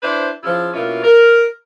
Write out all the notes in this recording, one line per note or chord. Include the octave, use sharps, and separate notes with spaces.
D4 E4 B4 C5
C#3 F3 E4 F4
B2 A#3 C#4 E4 F4
A#4